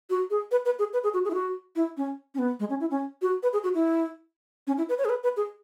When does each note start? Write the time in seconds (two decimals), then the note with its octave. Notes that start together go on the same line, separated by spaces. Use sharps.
0.10 F#4
0.31 G#4
0.51 B4
0.65 B4
0.79 G#4
0.93 B4
1.04 G#4
1.14 F#4
1.25 G#4
1.31 E4
1.34 F#4
1.76 E4
1.97 C#4
2.34 C#4
2.39 B3
2.60 G#3
2.70 C#4
2.80 E4
2.91 C#4
3.22 F#4
3.43 B4
3.53 G#4
3.63 F#4
3.74 E4
4.67 C#4
4.78 E4
4.89 B4
4.98 C#5
5.05 G#4
5.09 B4
5.24 B4
5.37 G#4